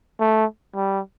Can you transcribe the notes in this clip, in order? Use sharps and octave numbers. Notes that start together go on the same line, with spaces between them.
A3
G3